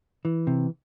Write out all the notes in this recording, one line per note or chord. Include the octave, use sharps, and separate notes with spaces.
E3
C3